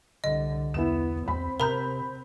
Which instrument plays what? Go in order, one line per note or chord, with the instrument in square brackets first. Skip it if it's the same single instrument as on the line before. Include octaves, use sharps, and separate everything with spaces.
[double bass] C2 D3 [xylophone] D#5
[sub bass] E2 [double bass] B3 [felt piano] E4 E7
[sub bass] E2 [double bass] C4 [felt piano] B5
[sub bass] C3 [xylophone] A#4 A#5 [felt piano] B5 G6